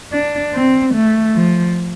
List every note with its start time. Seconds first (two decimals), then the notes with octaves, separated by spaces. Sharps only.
0.13 D4
0.54 C4
0.94 A3
1.35 F3